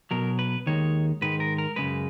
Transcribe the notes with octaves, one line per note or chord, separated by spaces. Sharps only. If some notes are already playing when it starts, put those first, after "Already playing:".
B1 B2 F#3 A#4
B4
D#2 D#3 G#3 C#5
G#2 D#3 G#3 B4
A#4
A#4
F#2 C#3 G#3 B4